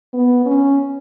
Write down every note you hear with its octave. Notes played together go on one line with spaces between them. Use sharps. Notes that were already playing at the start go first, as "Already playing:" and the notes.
B3
C#4